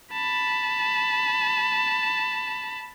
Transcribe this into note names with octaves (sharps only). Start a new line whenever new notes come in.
A5 B5